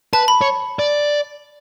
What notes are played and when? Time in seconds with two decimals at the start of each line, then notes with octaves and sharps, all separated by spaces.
0.13 B4 A5
0.28 B5
0.41 C#5
0.79 D5